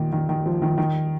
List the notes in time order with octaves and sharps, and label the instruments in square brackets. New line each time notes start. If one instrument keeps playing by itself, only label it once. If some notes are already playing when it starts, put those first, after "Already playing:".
Already playing: [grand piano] A#2 D#3
D#3
D#3
F3
D#3
D#3